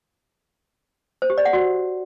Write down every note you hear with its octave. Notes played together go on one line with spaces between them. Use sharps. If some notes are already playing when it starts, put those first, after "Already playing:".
C5
G4
D5
F#5
F#4